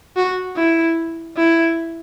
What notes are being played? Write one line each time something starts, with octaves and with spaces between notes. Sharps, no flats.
F#4
E4
E4